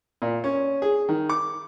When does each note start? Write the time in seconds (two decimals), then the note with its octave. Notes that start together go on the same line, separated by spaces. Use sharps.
0.22 A#2
0.44 C#4
0.82 G#4
1.09 D#3
1.29 D6